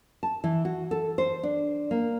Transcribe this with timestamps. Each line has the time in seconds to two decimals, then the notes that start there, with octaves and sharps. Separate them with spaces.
0.23 A5
0.44 E3
0.65 F#4
0.91 A4
1.18 C5
1.43 D4
1.91 A#3